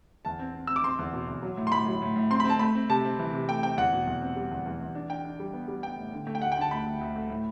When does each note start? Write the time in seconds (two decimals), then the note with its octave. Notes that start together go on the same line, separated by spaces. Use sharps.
0.25 E2 A5
0.39 C4
0.55 C4
0.67 C4 E6
0.76 D6
0.84 C4 C6
0.99 E2
1.13 B2
1.28 E2
1.42 F#3
1.57 A2
1.67 C6
1.72 A2 B5
1.87 F#3
2.02 A2
2.16 A2
2.31 C4 C6
2.40 B5
2.45 C4 A5
2.59 A3 B5
2.75 C4
2.89 C3 A5
3.05 C4
3.19 E3
3.33 C3
3.48 A3 G5
3.63 C4 G5
3.77 E2 F#5
3.93 B2
4.07 E2
4.22 C4
4.36 G3
4.51 E2
4.66 E2
4.81 E2
4.95 D4
5.10 D4 G5
5.25 D4
5.40 G3
5.54 B3
5.68 G3
5.83 B3 G5
5.97 A2
6.13 D3
6.27 A3
6.35 G5
6.42 D2 F#5
6.52 G5
6.57 D3 A5
6.71 D2 B5
6.86 D2
7.01 D2
7.16 A3
7.30 A2